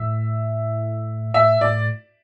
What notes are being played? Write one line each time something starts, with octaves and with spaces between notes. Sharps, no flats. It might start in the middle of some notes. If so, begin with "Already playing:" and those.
Already playing: A2 E5
A2 E5
A2 D5